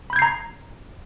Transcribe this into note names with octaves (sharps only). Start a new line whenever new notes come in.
A#5 B5 G6 G#6 C7